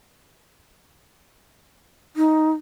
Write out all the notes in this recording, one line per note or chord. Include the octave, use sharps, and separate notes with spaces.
D#4